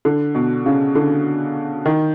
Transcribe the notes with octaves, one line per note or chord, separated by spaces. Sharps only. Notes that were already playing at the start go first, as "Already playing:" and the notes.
D3
B2
C#3
D3
D#3